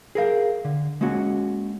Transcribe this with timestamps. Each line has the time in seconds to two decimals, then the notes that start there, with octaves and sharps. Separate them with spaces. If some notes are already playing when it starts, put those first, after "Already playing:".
0.15 G#4 A#4 F5
0.65 D3
1.01 G#3 A#3 C#4 F#4